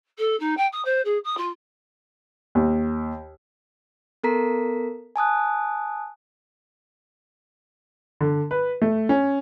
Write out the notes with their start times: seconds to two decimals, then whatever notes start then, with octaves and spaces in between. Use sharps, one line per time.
0.18 A4
0.39 D#4
0.57 G5
0.72 D#6
0.84 C5
1.04 G#4
1.24 D#6
1.37 F4
2.55 D#2
4.23 B3 A4 A#4 A#5 B6
5.16 G#5 A5 D#6 F#6
8.21 D3
8.51 B4
8.82 A3
9.09 C#4